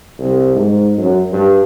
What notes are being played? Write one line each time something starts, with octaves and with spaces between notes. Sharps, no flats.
C2
G#2
F#2
G2